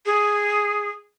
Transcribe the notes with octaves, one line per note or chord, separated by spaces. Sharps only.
G#4